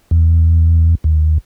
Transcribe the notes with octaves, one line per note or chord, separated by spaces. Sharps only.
E2
D#2